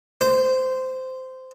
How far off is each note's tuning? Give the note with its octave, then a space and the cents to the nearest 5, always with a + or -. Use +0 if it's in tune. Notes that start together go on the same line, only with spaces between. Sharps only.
C5 -15